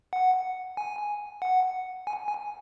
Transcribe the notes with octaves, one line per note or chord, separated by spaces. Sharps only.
F#5
G#5
F#5
G#5
G#5